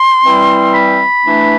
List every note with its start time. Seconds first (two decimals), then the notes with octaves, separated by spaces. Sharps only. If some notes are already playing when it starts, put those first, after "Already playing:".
Already playing: C6
0.22 E3 G3 C4 E4
0.73 B5
1.25 E3 A3 D4